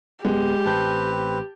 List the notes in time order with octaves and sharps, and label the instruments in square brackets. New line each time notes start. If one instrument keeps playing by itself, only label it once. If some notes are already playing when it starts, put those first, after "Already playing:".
[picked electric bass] D1 B3 [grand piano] G#3 [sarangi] G4
[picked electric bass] A1 [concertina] C4 B4 [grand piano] A5 G6